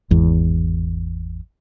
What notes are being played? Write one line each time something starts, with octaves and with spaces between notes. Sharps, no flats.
G#1 E2